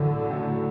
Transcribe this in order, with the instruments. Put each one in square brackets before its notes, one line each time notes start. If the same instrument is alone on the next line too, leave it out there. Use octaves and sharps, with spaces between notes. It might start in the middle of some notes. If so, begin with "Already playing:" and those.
Already playing: [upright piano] A2 F#3 A3 [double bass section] D3
[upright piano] A2 F#3 A3